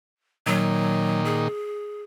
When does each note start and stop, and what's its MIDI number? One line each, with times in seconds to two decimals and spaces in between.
0.47 1.48 46
0.47 1.48 51
0.47 1.23 54
1.25 2.02 68